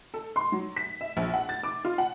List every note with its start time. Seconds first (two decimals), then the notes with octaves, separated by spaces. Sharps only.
0.14 A4
0.36 C6
0.52 F#3
0.76 B6
1.01 E5
1.17 A#1
1.34 F#5
1.49 A6
1.63 D6
1.85 F4
1.98 F#5